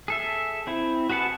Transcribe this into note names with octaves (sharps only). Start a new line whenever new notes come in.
G#4 A4 E5
C4 E4
F#4 G#4 B4 F#5 A5